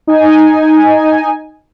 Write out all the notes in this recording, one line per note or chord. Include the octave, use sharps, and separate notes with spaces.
D#4 G#5